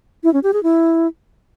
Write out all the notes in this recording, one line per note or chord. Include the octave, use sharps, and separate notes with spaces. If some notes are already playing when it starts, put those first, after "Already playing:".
E4
C#4
G4
G#4
E4